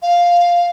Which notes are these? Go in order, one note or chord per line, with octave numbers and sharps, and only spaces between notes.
F5